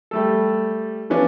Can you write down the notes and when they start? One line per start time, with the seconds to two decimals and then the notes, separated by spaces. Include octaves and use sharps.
0.11 G3 A3 A4
1.10 E3 F3 B3 C#4 D4